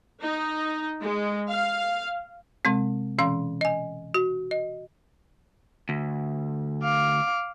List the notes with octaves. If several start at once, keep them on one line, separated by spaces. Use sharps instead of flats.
D#4
G#3
F5
C3 G#3 C4
B2 E3 C#4 F5 C6
D#5 G#5
F#4
D#5
D2
F5 D6